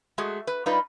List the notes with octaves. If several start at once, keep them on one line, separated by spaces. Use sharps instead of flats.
G#3 A3 F#4 G#4
B4
G3 D#4 F4 B4 D5 D#5